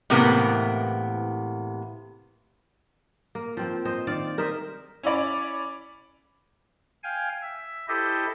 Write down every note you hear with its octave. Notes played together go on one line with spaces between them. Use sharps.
A2 C3 E3 A#3 B3
A#3
F3 C4 C5
C5 D#5
D#3 D5 F5
A#4 C5 D#5 E5
C#4 E4 C#5 D5 B5
F5 G5 G#5
E5
E4 G4 A4 C5 D#5 E5